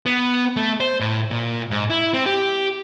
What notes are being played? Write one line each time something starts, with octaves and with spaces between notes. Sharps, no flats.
B3
A3
C5
A2
A#2
G#2
E4
C4
G4